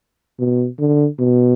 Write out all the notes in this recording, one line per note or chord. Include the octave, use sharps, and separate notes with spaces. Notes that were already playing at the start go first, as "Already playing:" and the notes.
B2
D3
B2